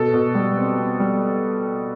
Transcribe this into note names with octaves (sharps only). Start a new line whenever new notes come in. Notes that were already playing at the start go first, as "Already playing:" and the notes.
Already playing: B2 A4
B2
G3
C4
C4
G3